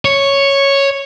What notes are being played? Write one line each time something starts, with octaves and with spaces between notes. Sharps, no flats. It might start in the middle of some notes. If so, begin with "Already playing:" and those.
C#5